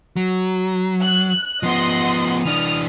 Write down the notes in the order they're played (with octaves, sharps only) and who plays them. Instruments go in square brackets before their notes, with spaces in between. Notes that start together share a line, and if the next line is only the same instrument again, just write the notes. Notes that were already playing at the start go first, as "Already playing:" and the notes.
[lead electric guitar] F#3
[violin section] F#6
[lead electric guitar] F3 B3 [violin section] D#5 F#5 C6
[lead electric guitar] E3 D4 [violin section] D#6 F6